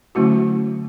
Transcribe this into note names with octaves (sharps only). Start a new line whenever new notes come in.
D3 F#3 A3 C#4 E4 F#4